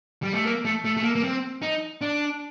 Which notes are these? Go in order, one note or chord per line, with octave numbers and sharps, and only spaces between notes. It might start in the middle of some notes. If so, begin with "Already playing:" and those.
G3
A3
A#3
A3
A3
A3
A#3
A#3
C4
D#4
D4